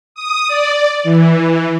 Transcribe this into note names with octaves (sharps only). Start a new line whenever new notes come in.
D#6
D5
E3